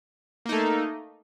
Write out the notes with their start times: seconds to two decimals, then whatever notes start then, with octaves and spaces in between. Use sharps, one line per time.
0.45 A#3
0.49 D#4
0.52 A3